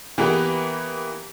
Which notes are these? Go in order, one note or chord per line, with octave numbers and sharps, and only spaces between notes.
E3 A#3 B3 G4 B4